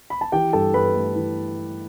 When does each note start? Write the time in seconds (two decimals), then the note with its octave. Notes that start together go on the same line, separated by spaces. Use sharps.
0.10 B5
0.21 A5
0.32 E3 G4 G5
0.53 G2 A4 A5
0.74 G2 B4 B5
0.95 A3
1.15 E3